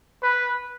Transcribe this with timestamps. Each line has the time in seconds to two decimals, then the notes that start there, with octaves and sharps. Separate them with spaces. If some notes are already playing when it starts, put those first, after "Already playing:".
0.23 B4